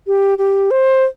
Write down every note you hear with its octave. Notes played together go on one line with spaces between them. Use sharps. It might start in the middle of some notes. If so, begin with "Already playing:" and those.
G4
G4
C5